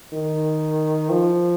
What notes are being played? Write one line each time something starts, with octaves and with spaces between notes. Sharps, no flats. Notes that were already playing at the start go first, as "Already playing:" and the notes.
D#3
F3